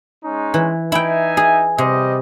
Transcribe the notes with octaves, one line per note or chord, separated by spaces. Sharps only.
G#3 C#4 D#4
E3
D#4 E4 E5 G5 G#5
G#4
C3 G3 D#5